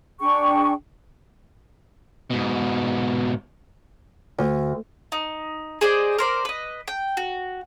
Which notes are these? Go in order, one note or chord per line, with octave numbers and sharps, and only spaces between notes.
D4 G#4 G5 C#6
G#2 B2
D2
D#4
G#4 C5 D5 D#5
A#4 C5 D5
B4 D#5
G5
F#4